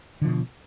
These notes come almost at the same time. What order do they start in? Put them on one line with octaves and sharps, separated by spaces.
D3 F3 B2